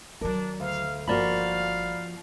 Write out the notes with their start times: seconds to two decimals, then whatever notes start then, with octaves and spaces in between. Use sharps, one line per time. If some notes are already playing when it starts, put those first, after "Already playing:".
0.21 D#3 F#3 D4 A#4
0.60 D2 F5
1.08 G1 F3 A#3 F#4 D5 F5 A#5 B5